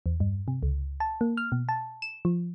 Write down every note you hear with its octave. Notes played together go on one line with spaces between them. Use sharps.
E2
G2
C3
C#2
A5
A#3
F6
B2
A5
E7
F3